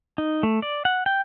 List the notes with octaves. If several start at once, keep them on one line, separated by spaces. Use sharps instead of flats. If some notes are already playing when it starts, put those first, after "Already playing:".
D#4
A3
D5
F#5
G5